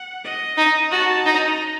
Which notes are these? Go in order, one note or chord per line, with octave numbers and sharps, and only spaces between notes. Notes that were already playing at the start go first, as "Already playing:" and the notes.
Already playing: F#5
D#5
D#4
F#4 A5
D#4 A#5